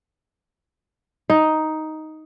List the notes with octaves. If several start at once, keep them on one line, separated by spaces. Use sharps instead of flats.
D#4